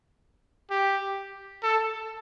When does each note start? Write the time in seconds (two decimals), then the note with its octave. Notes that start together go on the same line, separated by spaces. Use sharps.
0.70 G4
1.63 A4